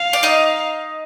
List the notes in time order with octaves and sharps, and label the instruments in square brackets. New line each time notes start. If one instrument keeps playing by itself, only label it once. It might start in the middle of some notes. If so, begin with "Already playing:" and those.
Already playing: [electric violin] F5
[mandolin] D5
D#4 D#5